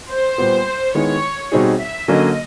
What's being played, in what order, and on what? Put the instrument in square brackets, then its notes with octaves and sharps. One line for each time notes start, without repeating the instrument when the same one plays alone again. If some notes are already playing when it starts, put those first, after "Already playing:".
[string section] C5
[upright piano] A#2 G3 B3
[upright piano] D#3 G#3 B3 E4 [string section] C#5
[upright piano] B2 G3 C4 D#4 G#4
[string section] E5
[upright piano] D3 F#3 A#3 C#4 [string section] D#5